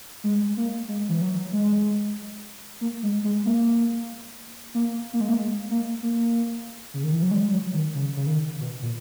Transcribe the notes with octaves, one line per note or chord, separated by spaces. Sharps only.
G#3
A#3
G#3
E3
F#3
G#3
A#3
G#3
G#3
A#3
A#3
A#3
G#3
A#3
G#3
A#3
A#3
C#3
D#3
E3
F#3
G#3
F#3
D#3
C#3
C#3
D#3
B2
A#2